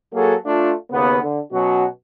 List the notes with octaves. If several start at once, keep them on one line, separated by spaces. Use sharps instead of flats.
F#3 A#3 F#4 G#4 A4
A3 D4 F4
D#2 C#3 B3
D3
B2 F#3 C#4 F#4